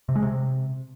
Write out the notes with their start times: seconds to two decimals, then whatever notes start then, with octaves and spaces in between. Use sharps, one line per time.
0.09 C3
0.16 G#3
0.23 C3